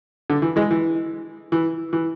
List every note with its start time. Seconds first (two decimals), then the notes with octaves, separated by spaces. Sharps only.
0.30 D3
0.42 E3
0.56 E3 G#3
0.71 E3
1.52 E3
1.93 E3